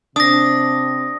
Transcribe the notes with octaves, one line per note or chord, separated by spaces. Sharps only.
C3 C4 D4 D#6 A#6